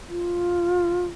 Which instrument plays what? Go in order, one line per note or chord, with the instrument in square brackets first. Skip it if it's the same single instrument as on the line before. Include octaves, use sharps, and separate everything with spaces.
[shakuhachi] F4